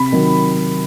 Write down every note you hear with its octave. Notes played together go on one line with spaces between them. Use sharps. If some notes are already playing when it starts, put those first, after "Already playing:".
Already playing: C3 B5
D#3 F#3